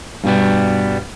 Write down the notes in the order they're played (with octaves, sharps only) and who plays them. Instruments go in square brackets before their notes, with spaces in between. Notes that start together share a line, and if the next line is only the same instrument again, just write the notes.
[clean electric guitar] G2 B2 G3 B3